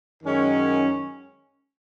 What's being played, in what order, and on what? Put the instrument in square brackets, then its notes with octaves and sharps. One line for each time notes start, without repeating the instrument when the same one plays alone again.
[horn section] F#2 D#3 G#3 C#4